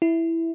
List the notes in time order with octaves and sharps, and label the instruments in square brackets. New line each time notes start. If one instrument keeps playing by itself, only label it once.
[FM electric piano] E4